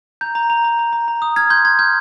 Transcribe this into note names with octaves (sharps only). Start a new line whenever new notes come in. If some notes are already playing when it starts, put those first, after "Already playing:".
A#5 G6
A#5
A#5
A#5
A#5
A#5
A#5
D#6
F6 G#6
C6 G6
C6 G#6
F6 G6